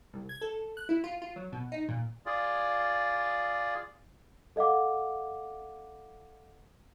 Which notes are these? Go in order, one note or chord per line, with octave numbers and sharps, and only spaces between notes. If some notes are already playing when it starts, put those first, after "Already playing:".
C2
G#6
A4
F#6
E4
F4
F4
F#3
B2
D#4
A#2
F4 G#4 D5
A4 D#5 F5 F#5 D6